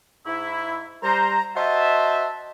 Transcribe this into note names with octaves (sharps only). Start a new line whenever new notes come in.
G#2 E4
G3 C5 A#5
F#4 C5 D#5 E5 A5